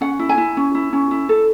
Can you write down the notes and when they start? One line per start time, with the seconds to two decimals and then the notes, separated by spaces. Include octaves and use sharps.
0.01 C#4 F#5
0.19 E4
0.29 G#5
0.38 E4
0.57 C#4
0.75 E4
0.93 C#4
1.11 E4
1.29 A4